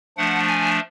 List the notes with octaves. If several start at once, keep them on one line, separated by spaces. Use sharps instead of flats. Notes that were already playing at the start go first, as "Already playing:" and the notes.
F3 A3 D4 F#5
G#5